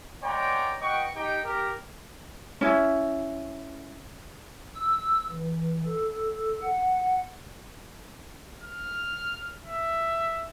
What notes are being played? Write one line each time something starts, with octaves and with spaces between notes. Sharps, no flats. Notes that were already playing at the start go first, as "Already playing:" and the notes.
G#3 B3 C#5 D5 G5 A#5
F#4 B4 D#5 G5 C#6
D#4 G4 G5
G4 A#4
C#4 E4
E6
E3
A4
F#5
F6
E5